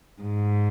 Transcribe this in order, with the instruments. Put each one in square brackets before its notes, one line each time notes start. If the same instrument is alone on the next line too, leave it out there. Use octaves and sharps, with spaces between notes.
[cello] G#2